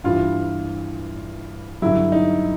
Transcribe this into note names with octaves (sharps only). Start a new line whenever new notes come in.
G2 E3 F4
G2 D3 F#3 E4
D#4